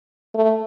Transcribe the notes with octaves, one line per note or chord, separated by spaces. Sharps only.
A3